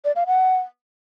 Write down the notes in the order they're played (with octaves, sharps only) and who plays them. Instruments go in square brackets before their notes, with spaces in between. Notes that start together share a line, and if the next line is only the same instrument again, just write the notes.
[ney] D5
F5
F#5